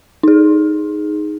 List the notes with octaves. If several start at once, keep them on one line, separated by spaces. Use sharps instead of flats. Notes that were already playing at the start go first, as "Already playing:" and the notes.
D#4 G#4